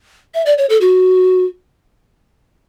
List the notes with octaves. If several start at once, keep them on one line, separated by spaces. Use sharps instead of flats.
E5
D5
C#5
A4
F#4